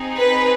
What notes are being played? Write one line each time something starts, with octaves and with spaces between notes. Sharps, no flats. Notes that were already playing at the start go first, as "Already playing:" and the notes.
Already playing: C4 D#4 G#4
B4